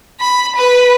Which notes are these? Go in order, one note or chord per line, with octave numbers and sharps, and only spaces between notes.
B5
B4